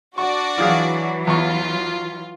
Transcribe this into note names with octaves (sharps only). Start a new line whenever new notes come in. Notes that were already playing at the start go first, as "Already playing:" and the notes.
D4 F#4 D5 C#6
E3 F#3 F4 G#4 F5
E2 F4 C#6